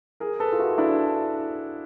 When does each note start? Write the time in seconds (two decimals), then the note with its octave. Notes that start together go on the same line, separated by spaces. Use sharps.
0.20 G#4 A#4
0.39 A4 B4
0.52 F4
0.59 E4 F#4
0.78 D4 E4